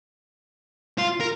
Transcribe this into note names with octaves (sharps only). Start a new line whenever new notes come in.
F4
A#4